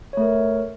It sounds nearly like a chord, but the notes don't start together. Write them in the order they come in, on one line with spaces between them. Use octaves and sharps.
C#5 A3 A#4